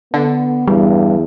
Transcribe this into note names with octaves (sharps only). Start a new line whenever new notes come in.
D3 B3
E2 G2 G3